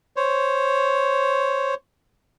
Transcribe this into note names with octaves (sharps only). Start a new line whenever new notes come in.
C5 C#5